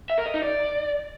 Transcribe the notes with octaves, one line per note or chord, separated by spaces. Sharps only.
E5
A#4
D#5
D#4
D5